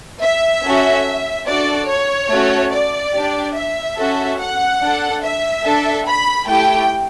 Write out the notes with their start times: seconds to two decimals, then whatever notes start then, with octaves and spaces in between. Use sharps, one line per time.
0.21 E5
0.63 C#4 F#4 A4
1.46 D4 F#4 A4 D5
1.88 C#5
2.30 A3 C#4 F#4 A4
2.71 D5
3.13 D4 G4
3.56 E5
3.97 C#4 F#4 A4
4.39 F#5
4.80 D4 A4
5.22 E5
5.65 D4 A4
6.06 B5
6.47 A3 E4 G4 G5